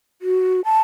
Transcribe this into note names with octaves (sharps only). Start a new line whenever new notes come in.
F#4
A5